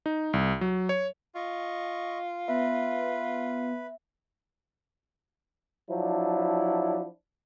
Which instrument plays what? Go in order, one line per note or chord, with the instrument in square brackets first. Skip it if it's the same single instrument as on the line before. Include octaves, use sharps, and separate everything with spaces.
[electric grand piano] D#4
C2
F#3
C#5
[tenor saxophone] F4 [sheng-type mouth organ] D#5 C#6
[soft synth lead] B3 [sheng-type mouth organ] B4 [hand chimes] E5
[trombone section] F3 F#3 D4 E4